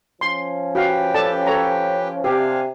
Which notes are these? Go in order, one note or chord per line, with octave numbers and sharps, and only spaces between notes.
F3 C#4 C6
F#4 G4 B4 F5 G5
A4 D5 A5
A4 C#5 A#5
C3 D4 G4 F5 G#5